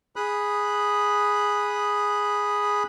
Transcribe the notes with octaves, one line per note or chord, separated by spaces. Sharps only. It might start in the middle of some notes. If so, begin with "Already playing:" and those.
G#4 B5 D#6 F#6